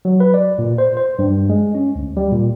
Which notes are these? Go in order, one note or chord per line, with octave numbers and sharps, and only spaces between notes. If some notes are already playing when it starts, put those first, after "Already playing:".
F#3
B4
D5
A#2
C5
C5
G2
G#3
C#4
D2
G3
A#2